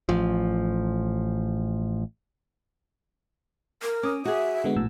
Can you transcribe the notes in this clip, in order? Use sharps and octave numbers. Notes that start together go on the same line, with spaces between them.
A1 F3
A#4
C#4 D6 D#6
F#4 G#4 E5
D3 G#3 B3
A#1 A2 E6